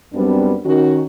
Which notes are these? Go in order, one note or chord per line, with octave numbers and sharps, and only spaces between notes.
F#2 G3 B3 C4 D4
D#3 C#4 F#4